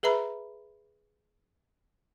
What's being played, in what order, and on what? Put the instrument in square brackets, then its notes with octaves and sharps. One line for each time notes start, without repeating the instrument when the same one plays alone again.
[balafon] G#4 B4 E5 A#5 B5